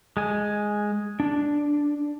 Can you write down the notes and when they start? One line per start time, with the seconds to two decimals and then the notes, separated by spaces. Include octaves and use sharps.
0.17 G#3 G#5
1.20 D4